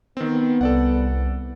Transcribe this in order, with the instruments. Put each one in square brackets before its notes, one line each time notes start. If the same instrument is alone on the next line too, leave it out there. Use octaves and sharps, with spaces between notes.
[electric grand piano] D#3 C4 [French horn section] B3
[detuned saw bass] C2 [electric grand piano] A4 D5 F#5